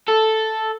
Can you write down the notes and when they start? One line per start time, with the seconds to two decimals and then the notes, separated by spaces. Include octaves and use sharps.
0.08 A4